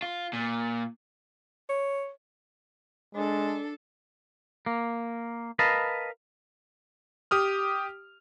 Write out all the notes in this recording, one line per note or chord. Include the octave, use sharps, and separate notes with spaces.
F4
A#2
C#5
G#3 D4 A4
A#3
A#4 B4 D#5 F5 A5
G4 D#6 F6